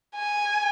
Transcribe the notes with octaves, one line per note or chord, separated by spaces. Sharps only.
G#5